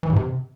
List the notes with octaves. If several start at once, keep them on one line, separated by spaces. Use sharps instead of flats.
E3
G#2
C3